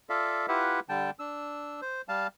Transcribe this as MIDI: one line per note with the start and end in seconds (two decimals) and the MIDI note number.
0.09 0.46 65
0.09 0.46 69
0.09 0.46 74
0.09 0.46 76
0.09 0.46 77
0.48 0.80 64
0.48 0.80 65
0.48 0.80 67
0.48 0.80 71
0.48 0.80 76
0.48 0.80 78
0.89 1.11 50
0.89 1.11 55
0.89 1.11 79
0.89 1.11 81
1.19 1.81 62
1.19 1.81 88
1.82 2.02 72
2.09 2.27 55
2.09 2.27 77
2.09 2.27 81